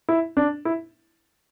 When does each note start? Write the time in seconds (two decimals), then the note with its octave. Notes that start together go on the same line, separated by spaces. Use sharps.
0.09 E4
0.37 D4
0.65 E4